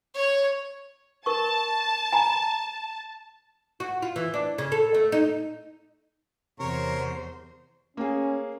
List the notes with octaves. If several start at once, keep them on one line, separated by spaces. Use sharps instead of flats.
C#5
A#4 A5 C#6
G#5 A#5 B5
F#4
F4
E3
D4
C#3
A4
A3
D#4
E2 C3 A#4 C5 C#5
A#3 C#4 G#4